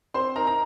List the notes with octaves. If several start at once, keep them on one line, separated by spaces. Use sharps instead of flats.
C4 C5 C6
D#4 A#4 A#5
A#5